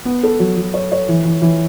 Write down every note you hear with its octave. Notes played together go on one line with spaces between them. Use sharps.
B3
A4
F#3
F#3
C#5
C#5
E3
E3
E3